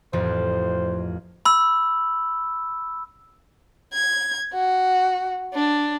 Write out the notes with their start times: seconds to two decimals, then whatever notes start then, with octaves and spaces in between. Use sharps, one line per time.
0.13 A1 F2 F3 C5
1.45 B5 E6
3.93 G#6
4.53 F#4
5.54 D4